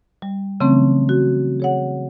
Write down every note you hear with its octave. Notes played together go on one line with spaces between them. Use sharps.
G3
C#3 E3 F#3 A3 C4 C#4
F#4
G#4 C#5 F#5